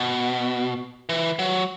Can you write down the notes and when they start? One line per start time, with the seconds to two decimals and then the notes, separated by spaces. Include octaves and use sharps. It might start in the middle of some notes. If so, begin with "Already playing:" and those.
Already playing: B2
1.09 E3
1.39 F#3